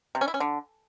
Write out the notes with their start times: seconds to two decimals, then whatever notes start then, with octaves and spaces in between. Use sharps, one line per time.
0.15 C3
0.21 C#4
0.28 E4
0.34 C#4
0.40 D3